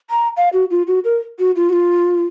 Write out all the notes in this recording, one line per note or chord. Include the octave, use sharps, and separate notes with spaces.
A#5
F5
F#4
F4
F#4
A#4
F#4
F4
F#4
F4